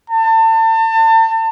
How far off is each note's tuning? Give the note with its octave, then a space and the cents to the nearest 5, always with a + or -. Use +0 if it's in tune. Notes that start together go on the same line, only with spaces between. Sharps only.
A5 +35